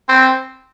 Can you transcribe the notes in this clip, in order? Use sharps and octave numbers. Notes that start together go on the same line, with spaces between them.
C4